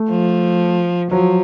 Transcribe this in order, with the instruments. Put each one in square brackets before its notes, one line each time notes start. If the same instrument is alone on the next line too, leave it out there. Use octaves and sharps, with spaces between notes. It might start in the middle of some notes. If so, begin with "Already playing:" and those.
Already playing: [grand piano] A3
[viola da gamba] F3
[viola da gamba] F3 [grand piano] F#3